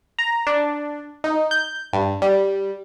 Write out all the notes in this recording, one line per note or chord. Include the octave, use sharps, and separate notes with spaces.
A#5
D4
D#4
G6
G2
G3